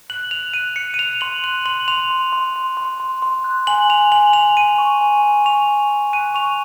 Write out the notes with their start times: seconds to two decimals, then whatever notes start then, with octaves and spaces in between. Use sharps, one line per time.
0.10 F#6 F#7
0.31 F#6 F7
0.53 F#6 D#7
0.76 F#6 C#7
0.94 D#7
0.99 F#6 F7
1.21 C6 F#7
1.44 F#6 F#7
1.65 C6 F#7
1.88 C6 F7
2.10 C6
2.33 C6
2.56 C6
2.77 C6
3.00 C6
3.22 C6
3.44 F#6
3.67 G#5 F#7
3.89 G#5 F7
4.12 G#5 F#7
4.33 G#5 F7
4.57 G#5 D#7
4.78 C#6
5.01 G#5
5.23 G#5
5.45 C#6 F7
5.68 G#5
5.90 C#6
6.13 F#6 D#7
6.34 C#6 F7